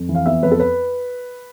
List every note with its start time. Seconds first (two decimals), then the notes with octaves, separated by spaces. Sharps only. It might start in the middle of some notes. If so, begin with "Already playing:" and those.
Already playing: F2
0.09 E3
0.15 F5
0.26 B3 E5
0.43 F2 B4
0.51 A4
0.60 B4